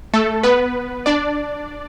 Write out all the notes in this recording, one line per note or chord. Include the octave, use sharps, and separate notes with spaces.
A3 A4
B3 B4
D4 D5